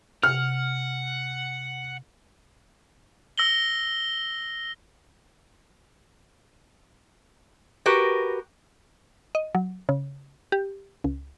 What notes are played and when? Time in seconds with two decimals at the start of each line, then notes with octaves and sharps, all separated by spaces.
0.23 C3 F#5 F6
3.38 E6 A#6 F#7 G7
7.86 F#4 G4 A#4 B4
9.35 D#5
9.55 F#3
9.89 C#3
10.52 G4
11.04 C#2